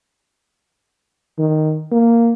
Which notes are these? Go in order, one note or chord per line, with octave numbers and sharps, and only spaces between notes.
D#3
A#3